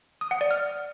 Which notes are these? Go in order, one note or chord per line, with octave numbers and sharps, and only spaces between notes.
D#6
F#5
D5
F6